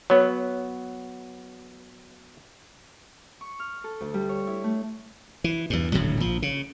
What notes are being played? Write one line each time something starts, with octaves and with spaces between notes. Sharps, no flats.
F#3 B3 C#5
C#6
F6
A4
D2
G3
C#5
E4
A3
E3
E2 G2
D#1 A2 D3 F#3
A#1 F3
C#3